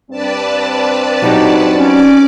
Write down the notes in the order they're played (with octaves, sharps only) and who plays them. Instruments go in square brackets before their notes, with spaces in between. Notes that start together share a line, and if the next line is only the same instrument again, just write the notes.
[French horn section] G2 C4 [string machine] B4 D5 A5
[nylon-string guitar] F#3 D#4 G4
[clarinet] C#4 [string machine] D5 D6